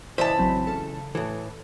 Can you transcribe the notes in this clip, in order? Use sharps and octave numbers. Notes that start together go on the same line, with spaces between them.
C#2 E3 E4 C5 D5 D#5 A5 B5
A1 F#3 C4
C#3 A4
A2 E3 A4